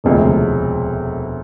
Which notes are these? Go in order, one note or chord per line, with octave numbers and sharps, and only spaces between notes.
E1 D2 C3 F3 G#3